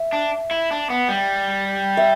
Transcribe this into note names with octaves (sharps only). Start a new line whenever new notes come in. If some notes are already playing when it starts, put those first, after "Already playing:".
Already playing: E5
D4
E4
D4
B3
G3
E5